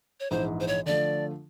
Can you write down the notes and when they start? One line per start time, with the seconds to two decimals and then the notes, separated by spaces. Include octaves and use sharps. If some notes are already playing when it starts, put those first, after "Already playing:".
0.20 C#5
0.31 A#1 G#2 E3 C5
0.60 C5
0.67 C#5
0.86 D3 F3 A3 D5